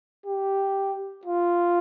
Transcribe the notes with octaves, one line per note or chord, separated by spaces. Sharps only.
G4
F4